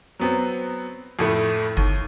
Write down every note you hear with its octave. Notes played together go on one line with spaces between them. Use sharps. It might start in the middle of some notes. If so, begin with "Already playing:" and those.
F#3 B3 C4
F2 A2 A3
G1 D#2